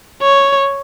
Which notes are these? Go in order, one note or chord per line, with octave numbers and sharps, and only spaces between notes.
C#5